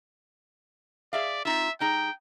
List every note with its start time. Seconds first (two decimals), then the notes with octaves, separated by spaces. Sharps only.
1.13 G#4 D5 E5 F5
1.45 C4 D#4 F4 E5
1.80 G3 D#4 G#4 G5